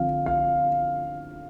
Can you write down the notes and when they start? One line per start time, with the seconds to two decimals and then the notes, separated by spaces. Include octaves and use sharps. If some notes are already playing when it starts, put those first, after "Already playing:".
Already playing: D3 F3 C4 F5
0.26 F5